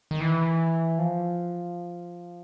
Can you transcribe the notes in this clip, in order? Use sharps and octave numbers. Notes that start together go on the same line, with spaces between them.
D#3
E3
F3